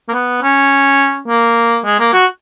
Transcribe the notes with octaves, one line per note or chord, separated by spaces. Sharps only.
A#3
B3
C#4
A#3
G#3
A#3
F#4